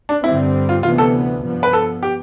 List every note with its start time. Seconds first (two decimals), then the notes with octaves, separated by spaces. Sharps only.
0.09 D4
0.24 G2 D3 G3 C4 E4
0.69 F4
0.83 D2 C3 E3 B3 F4
0.98 A4
1.44 G2 F3 B3
1.63 B4
1.73 A4
2.03 G4